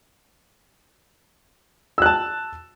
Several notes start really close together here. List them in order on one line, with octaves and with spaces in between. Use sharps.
E6 F#6 A5